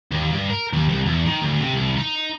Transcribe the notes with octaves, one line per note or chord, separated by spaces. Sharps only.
D#2
G2
A#4
D#2
C2
E2
D#3
D2
C3
C2
D#4